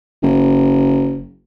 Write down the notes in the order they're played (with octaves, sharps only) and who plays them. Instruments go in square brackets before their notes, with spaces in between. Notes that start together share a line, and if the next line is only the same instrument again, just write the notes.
[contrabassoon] F#1